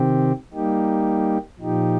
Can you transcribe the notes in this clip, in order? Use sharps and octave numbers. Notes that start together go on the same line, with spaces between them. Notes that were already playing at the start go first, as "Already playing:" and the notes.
Already playing: C3 D#3 C4 G4
G3 A#3 D#4 G4
A#2 F3 D#4 G4